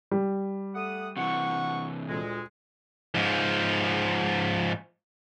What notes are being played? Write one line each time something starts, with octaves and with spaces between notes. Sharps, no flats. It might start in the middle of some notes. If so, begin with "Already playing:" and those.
G3
A3 F#5 D#6
C3 E3 F#5 C#6
D2 A#2 G#3
G#2 F3